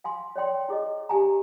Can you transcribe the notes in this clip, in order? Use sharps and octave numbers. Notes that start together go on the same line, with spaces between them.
F5 G#5 C6
C#5 D5 G5 C6
E4 G#4 A4 D#5
D4 G4 G#5 A#5